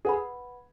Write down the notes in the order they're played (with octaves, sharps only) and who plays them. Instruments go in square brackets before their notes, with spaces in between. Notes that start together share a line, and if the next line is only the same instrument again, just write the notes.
[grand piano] G#4 [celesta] B4 F#5 B5